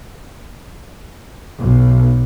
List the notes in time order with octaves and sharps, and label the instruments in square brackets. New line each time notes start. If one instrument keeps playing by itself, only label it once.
[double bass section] B1